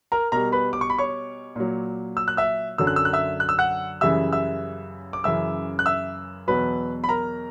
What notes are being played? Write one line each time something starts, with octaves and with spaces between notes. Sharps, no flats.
A#4 A#5
B2 G3 A#4 A#5
B4 B5
D6
C#6
B5
C#5 C#6
A#2 F#3
E6
F#6
E5 E6
F#2 D3 F#3 E6
F#6
E6
F#6
E5 E6
F#6
E6
F#5 F#6
F#2 C#3 E3 G3 E5 E6
E5 E6
D6
F#2 C#3 E3 E5 E6
F#6
E5 E6
E2 B2 F#3 B4 B5
B5
A#4 A#5